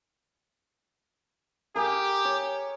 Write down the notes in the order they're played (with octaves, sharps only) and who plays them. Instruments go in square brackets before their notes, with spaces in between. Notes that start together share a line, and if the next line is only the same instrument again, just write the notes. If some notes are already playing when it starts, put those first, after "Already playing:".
[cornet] G4 [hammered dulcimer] G#4 A#4
[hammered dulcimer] C#5